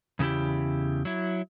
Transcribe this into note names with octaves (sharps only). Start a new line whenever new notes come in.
E2 C#3 G#3 E4 G4
F#3 E4